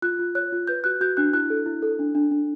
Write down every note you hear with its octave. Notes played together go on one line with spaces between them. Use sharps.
F4 F#6
F4
C#5 F#6
F4
B4 G6
F#4 F#6
F#4 G6
D4 F#6
E4 F#6
A4
E4
A4
D4
D4
D4